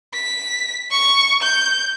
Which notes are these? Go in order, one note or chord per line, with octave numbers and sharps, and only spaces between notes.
B6
C#6
G6